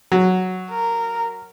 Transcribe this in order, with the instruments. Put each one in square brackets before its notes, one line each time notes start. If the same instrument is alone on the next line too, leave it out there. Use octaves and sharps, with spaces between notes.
[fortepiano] F#3
[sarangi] A#4